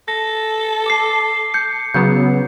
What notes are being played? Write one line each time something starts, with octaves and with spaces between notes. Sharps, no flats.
A4 A#6
D6 C7
G6 C#7
C#3 F#3 B3 G6